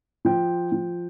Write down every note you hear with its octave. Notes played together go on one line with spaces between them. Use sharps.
F3 G5
F3